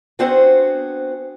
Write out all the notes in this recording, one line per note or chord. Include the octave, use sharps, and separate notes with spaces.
B3 C4 D4 F#4 G#4 C5